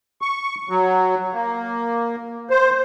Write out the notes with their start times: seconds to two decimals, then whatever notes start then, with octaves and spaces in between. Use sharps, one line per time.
0.22 C#6
0.69 F#3
1.34 A#3
2.50 C5